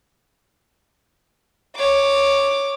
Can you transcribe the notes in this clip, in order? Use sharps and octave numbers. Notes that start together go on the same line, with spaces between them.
C#5 D6